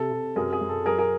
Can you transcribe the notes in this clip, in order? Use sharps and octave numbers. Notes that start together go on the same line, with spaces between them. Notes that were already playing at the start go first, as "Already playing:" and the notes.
Already playing: C3 A4
C3
F#2 G#4 A#4
G#4
F#2
A4
F#3 G#4 A#4
G#4 A#4